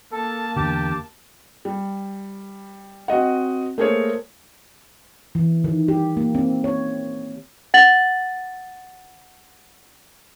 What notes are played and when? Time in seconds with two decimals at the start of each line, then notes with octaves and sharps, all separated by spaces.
0.12 A#3 A4 A5
0.56 E2 D3 G4
1.65 G3
3.08 C4 F#4 D#5 F#5
3.78 A3 A#3 G#4 A#4 C5 C#5
5.35 E3
5.64 D#3
5.88 G4
6.17 A#3
6.35 C4
6.64 C#5
7.74 F#5 A6 F#7